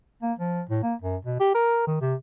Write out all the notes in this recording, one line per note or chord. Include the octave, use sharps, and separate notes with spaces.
A#3
F3
A2
A#3
F#2
B2
G4
A#4
D#3
C3